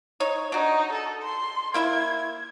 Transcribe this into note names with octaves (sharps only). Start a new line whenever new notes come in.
D#4 C#5
D4 D#4 F#4
A4
C6
A#3 E4 E5 G#6